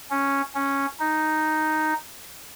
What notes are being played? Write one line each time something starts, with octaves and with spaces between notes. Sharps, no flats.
C#4
C#4
D#4